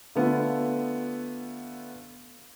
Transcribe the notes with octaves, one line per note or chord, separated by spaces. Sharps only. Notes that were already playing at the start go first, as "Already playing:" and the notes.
D3 A3 B3 F4